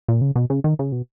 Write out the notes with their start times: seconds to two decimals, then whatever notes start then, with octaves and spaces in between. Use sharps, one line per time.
0.08 A#2
0.21 C#3
0.36 B2
0.50 C#3
0.64 D#3
0.79 C#3
0.92 B2